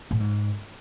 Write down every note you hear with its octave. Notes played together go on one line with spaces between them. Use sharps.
A2
G#2